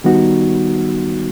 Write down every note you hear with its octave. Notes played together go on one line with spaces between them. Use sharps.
D#3 G3 B3 D#4 F#4